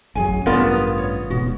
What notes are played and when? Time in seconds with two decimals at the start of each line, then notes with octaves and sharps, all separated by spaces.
0.15 A1 F#2 F#3 G#4 G#5
0.46 A1 G2 C#3 B3 F4 A#4 B4 D5
0.98 C#5
1.30 E1 G#2 B2 F#4